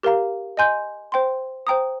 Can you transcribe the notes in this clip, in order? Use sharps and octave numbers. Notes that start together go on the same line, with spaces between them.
G4 A#4 F5 A#5
D#5 G#5 C6 G6
C5 G5 C6
C5 G5 A#5 D#6